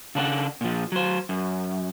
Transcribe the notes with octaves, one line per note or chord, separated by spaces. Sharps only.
C#3 D4 B4 F#5
A#2 F3
F#3 C5
F#2